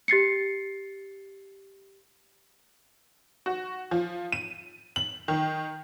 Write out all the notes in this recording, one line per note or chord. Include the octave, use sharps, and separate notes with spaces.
G4 A6 C7 C#7
F#4
F3
D#7
F#7
D#3